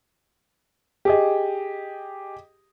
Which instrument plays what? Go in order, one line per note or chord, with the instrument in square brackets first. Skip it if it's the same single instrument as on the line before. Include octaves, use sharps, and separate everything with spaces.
[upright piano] G4 G#4 D#5